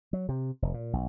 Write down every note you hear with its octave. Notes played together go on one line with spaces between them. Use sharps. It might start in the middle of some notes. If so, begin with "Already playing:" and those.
F#3
C3
F1
A#2
B1